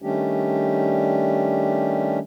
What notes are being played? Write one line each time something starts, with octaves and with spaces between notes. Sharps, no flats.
D#3 G3 A3 C#4 D4 G4